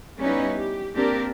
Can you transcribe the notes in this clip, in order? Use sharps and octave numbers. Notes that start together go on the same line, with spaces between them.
G3 B3 C#4 D#4 E4 B4
G4
A#3 C4 D4 G4 A#4